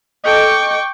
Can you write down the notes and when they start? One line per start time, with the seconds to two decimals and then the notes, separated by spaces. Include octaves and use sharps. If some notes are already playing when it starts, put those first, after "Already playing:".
0.24 A4 D#5 G5 C#6 D6